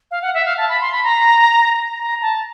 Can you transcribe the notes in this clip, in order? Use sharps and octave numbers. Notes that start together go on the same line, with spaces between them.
F5
F#5
E5
F5
A5
B5
C6
B5
A#5
A#5
A5